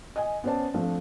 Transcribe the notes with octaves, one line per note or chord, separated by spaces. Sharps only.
D#5 G#5
B3 C#4 C5 D5 A5
F3 A3 C4 D4